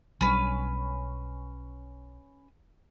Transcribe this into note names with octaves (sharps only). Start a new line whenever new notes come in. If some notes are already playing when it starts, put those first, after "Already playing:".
B1 G3 C#4 D4 B4